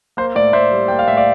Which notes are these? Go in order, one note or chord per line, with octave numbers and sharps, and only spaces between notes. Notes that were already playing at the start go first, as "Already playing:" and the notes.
A#3 C5
A2 D5
A2 C5 E5
G3
A#3 G5
F5
A2 E5
D5 F5